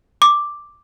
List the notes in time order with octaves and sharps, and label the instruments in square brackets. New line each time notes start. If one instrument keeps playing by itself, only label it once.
[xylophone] D6